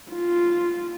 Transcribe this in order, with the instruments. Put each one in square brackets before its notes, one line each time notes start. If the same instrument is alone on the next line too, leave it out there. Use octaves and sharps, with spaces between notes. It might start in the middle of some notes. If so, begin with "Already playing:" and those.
[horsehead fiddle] F4